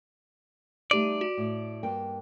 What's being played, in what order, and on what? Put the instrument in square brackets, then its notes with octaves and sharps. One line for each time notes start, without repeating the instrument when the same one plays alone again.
[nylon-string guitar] G3 A3 D#4 [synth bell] G4 D#7 [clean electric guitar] D5
[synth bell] F#4
[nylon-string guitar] A2
G2 A#3 G5